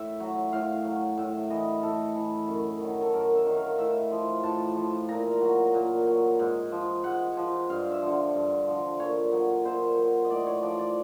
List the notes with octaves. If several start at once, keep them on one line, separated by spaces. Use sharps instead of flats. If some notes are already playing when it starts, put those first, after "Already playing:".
Already playing: A2 E5
F#3
A2 F5
F#3
A2 E5
E3 D#5
A2 A4
E3
F#2
D#3 F#3
A4
F#2 A#4
E5
D#3 F#3
F5
A2 E5
F3
A2 A5
F3
A#2 A#5
F#3
A#2
F#3
G#2
F3
G#2 F#5
F3
G2 F5
E5
D3 F3
G2
D3 F3
A#2 C#5
F#3
A#2 C5
F#3
D#5
A2 D5
C#5
F3 D5
D5